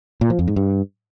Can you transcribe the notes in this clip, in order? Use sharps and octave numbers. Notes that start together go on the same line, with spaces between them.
A#2
F3
F2
G#2
G2